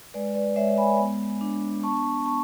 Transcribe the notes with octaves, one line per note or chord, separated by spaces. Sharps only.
G#3 B4 D5
B4 D5
G#3 C#5 E5
G#5 B5
B3
D4
B3 A5 C#6
B3 A5 C#6